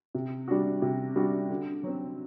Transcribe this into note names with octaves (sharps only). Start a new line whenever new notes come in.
C3
G3 D4 F#4
C3
G3 D4 F#4
D3
F#3 C4